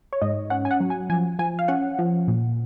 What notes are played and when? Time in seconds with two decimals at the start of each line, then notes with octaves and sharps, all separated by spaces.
0.13 C#5
0.22 G#2 D#5
0.50 C#4 F#5
0.65 G#5
0.71 F#5
0.80 F#3
0.90 G#5
1.10 F3 G#5
1.39 F3 G#5
1.59 F5
1.68 C#4 F#5
1.99 F3
2.28 A#2